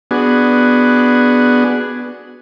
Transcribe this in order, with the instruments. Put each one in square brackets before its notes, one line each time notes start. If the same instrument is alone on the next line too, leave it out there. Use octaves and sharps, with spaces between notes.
[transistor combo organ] B3 D4 F#4 G#4